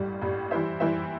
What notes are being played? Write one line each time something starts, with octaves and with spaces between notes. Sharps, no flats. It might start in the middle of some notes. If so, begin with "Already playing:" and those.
Already playing: A1 G2 G3
A1 G2 G3
E3 G3 E4 C5 E5
E3 G3 E4 C5 E5